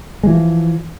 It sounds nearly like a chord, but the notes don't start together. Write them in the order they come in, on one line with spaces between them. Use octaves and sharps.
G#3 E3 F3